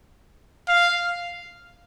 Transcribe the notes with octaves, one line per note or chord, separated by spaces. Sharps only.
F5